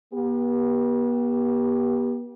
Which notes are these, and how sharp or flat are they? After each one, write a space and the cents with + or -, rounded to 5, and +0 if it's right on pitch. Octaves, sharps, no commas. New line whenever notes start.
B3 -40 G4 +5